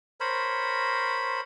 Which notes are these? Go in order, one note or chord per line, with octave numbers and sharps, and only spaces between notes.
A#4 C5 C#5 B5